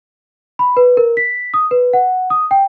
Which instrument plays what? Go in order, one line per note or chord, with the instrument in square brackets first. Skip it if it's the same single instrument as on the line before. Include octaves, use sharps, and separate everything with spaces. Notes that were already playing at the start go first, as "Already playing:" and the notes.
[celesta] B5
B4
A#4
B6
D#6
B4
F#5
D#6
G5